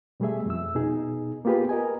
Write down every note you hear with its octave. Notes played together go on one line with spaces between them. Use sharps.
B2 G3 A3 G#4 E5
F2 E6
B2 D#4 G#4
A#3 B3 F4 G4 G#4 B4
A#4 D#5 G#5